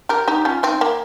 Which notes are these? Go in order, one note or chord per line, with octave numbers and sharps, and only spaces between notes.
G4 A#4
D#4 G4
C#4 F4
C4 D#4
A#3